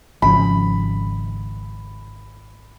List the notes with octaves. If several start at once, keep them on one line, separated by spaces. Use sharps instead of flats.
G#1 C#3 F3 B5